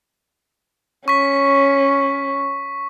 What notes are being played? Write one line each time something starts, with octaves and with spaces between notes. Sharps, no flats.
C#4 C#6 B6